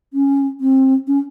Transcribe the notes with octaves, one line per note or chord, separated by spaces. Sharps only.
C#4
C4
C#4